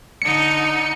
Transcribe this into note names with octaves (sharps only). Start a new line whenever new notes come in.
D3 D#4 C#7